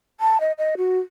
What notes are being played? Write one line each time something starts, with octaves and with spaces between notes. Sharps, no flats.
A5
D#5
D#5
F#4